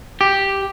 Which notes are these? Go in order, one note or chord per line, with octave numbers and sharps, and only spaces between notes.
G4